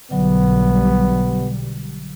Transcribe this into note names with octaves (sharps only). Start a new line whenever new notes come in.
B1 D3 F#3 G3 B3